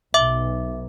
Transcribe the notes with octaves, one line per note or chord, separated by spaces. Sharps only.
B1 E5 D6